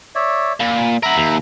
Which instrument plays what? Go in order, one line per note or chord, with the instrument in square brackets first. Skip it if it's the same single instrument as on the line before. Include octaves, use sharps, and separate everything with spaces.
[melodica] C#5 D5 E5
[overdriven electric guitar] A#2 [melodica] B5
[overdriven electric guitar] A#4 F#5 [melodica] E5 A#5 B5
[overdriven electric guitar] D#2